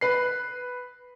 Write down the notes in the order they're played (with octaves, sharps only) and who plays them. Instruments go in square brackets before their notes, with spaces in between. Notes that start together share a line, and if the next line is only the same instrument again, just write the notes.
[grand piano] B4 C7